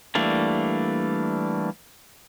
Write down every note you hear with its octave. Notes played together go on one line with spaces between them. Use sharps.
E3 G3 A3 A#3 D4